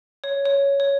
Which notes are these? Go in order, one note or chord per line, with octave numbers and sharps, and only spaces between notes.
C#5
C#5
C#5